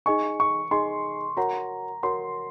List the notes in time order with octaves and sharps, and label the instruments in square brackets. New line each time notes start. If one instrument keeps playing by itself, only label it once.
[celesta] D#4 G#4 D#5 G#5 [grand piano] C#6
[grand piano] C#6
[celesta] D#4 G#4 D#5 G#5 [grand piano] C6
[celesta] F#4 A#4 C#5 F#5 [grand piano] A#5
[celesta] F#4 A#4 C#5 F#5 [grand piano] C6